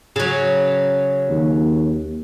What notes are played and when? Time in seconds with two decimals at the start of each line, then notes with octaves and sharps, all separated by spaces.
0.16 C#3 F#3
1.30 D#2